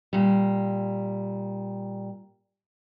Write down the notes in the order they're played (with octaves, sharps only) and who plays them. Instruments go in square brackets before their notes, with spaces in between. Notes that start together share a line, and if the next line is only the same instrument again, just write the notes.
[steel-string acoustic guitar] A#2 G3